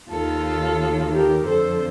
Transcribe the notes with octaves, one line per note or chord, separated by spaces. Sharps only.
D#2 D#3 F4 A4
G4 A#4
F2 D3 A4 C5